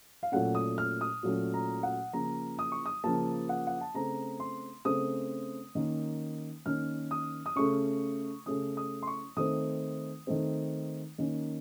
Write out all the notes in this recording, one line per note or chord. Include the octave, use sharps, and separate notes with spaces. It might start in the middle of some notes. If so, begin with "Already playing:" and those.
F5
A#2 F#3 A3 C#4 F#5
D#6
F6
D#6
A#2 F#3 A3 C#4
A#5
F#5
C#3 F3 A#3 A#5
D#6
C#6
D#6
C#3 F3 A#3 A5
F#5
F#5
A5
C#3 A3 C4 A#5
C6
C#3 A3 C4 D#6
D#3 A#3 C#4
D#3 A#3 C#4 F6
D#6
D#6
C#3 A3 C#4 C#6
C#3 A3 C#4 D#6
D#6
C6
C#6
D#3 A3 C4 D#6
D#3 A3 C4
D#3 A#3 C#4